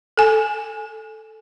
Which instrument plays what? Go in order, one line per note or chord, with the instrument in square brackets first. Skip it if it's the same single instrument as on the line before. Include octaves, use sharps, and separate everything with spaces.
[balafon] A4 G#5